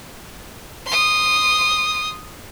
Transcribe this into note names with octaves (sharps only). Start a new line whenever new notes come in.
C6 D#6